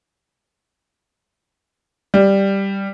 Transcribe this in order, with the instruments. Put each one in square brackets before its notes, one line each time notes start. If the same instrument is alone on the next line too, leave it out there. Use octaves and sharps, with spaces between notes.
[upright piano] G3